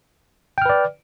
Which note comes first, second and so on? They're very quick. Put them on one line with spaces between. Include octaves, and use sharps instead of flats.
G5 F6 B4 D5